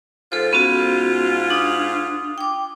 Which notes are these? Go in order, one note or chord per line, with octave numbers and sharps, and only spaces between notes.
G#2 F4 A4 C5
B3 C#4 F#4
D4 D#6
G5 D6